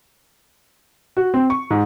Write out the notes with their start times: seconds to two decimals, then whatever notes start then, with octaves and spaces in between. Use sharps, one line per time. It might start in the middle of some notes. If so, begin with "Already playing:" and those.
1.17 F#4
1.34 C4
1.50 C#6
1.71 G#2